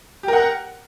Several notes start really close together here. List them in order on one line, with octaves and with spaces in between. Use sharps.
G4 A#4 F#5